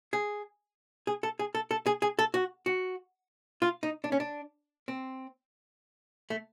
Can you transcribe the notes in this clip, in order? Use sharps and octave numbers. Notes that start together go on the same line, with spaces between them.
G#4
G#4
A4
G#4
A4
A4
G#4
G#4
A4
F#4
F#4
F4
D#4
D4
C#4
D4
C4
A3